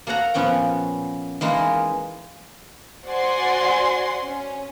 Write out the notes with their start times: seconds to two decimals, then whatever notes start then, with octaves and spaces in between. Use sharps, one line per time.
0.07 A#3 A4 C#5 F#5 A#5
0.34 A#2 F3 B3 C#4 G5 A#5
1.41 E3 G#3 A#3 D#4 A#4
3.05 F#4 C5 D5 F#5 G#5 C6
4.23 C#4